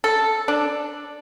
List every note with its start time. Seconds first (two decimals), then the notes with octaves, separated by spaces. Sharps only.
0.04 A4
0.48 D4